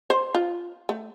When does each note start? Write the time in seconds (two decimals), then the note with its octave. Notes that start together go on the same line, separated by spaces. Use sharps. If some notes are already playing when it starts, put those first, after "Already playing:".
0.10 C5
0.35 F4
0.89 A3